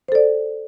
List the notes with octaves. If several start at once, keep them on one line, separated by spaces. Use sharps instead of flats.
A4 C5 D5